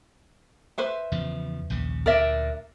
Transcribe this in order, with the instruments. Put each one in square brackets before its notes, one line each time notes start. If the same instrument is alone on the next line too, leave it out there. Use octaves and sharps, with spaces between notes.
[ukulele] B4 C5 E5
[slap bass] E2 C#3 F3
A#1 D#2 C#3
[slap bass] D2 A#2 [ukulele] A#4 D5 E5